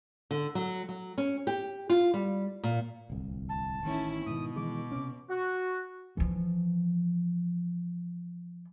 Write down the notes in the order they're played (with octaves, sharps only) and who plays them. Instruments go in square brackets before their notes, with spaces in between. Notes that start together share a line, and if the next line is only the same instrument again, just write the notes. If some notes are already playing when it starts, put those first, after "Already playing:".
[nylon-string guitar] D3
F#3
F#3
C#4
G4
F4
G3
A#2
[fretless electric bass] D1 C2
[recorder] A5
[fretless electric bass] A1 D#3 [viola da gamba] C#4 E4
[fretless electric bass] G#2 D#3 [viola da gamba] B2 [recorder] D#6
[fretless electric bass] D#3 E3 G#3 [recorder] D6
[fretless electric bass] C3 C#4
[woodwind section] F#4
[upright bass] E3 F3